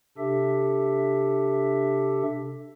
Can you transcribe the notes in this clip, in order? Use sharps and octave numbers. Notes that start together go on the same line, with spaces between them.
C3 D4 G4 A4 E5